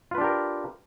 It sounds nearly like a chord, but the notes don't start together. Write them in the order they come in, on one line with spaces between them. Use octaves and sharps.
F4 B4 D4 G4 A#4